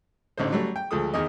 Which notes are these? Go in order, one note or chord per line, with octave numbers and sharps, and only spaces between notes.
A1 D3 D#4 C5
F#3 G3 A3
G5
D2 F3 G#3 A4 D#6
E2 D#3 D#5